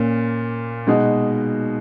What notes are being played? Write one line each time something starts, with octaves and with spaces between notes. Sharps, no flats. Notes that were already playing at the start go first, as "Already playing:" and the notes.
Already playing: A#2 A#3 C#4
B2 G#3 D#4 F#4